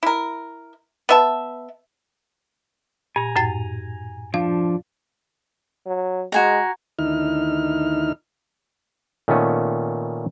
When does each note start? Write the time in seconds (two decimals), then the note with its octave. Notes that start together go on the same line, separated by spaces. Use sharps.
0.03 E4 A#4
1.09 B3 E5 A5
3.16 A#2 G#5 A#5
3.36 F#2 A2 A6
4.34 F3 D4 F5
5.86 F#3
6.32 G#3 F#4 G#5 A#5
6.99 D2 D#3 D#4 E4 F6
9.28 A#2 D#3 A3 B3 C#4